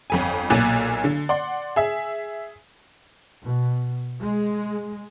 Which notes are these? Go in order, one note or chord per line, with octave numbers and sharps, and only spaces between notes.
G1 F2 G#5
B1 A#2 G#5 D6 F#6 A6
D3
D5 F#5 C6
G#4 E5
B2
G#3